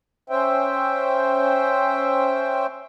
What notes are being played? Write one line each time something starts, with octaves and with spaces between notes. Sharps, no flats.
C#4 C5 E5 G5